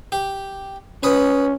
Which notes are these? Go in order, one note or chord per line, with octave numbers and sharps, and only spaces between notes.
G4
C#4 B4 D#6